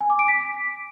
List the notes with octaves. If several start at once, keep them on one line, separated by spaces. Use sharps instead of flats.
G#5
D6
D7
B6